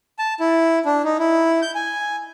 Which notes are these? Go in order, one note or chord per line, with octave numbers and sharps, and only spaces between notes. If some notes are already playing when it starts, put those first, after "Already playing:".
A5
E4
D4
D#4
E4
G6
G#5